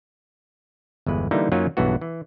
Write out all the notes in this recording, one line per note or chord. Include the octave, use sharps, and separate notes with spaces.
G1 E2 G#3 B4
D3 E3 G3 A#3 D#4 E4
F#2 F#3 A#3 C#4 D#4 F4
B1 G2 E3 B3 F#4
E3